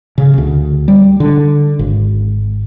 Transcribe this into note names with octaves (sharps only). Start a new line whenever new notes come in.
C#3
D2
G3
D3
G#1